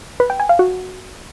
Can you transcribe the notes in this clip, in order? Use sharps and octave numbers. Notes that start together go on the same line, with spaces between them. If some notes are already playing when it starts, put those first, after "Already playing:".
B4
G5
G#5
F5
F#4